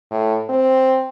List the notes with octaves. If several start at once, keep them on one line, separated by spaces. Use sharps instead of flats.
A2
C4